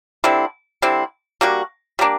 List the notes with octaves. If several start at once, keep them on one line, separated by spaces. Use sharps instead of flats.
D3 G3 C4 E4
D3 G3 C4 E4
G3 A#3 D4 F#4
G3 A#3 D4